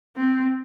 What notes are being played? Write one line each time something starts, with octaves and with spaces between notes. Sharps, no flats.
C4